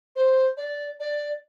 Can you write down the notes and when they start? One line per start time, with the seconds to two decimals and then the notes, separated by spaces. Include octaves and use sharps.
0.16 C5
0.57 D5
1.00 D5